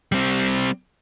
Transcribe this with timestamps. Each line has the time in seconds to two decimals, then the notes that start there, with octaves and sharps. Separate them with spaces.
0.12 G3 C4